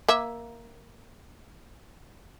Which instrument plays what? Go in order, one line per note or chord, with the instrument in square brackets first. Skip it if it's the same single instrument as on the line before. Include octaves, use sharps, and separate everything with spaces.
[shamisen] A#3 E5